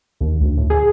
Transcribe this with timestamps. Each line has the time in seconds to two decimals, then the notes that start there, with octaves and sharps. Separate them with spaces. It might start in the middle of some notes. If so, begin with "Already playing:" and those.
0.21 D#2
0.41 D2
0.57 A2
0.70 G#4